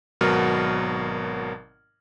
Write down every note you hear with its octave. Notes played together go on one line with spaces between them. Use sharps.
G#1 B2 F#3 A#4 F6